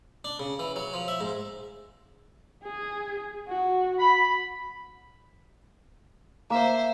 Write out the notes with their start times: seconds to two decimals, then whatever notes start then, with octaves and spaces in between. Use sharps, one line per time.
0.25 D4
0.39 C#3
0.59 E3
0.76 F#3
0.93 F3
1.08 E5
1.21 G#2
2.63 G#4
3.48 F#4
3.99 B5
6.50 A#3 C5 E5